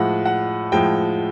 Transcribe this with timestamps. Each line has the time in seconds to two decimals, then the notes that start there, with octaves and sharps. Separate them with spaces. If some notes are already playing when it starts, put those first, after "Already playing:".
Already playing: A2 F3 G#3 F#5
0.25 F#5
0.72 A2 F3 G#3 G5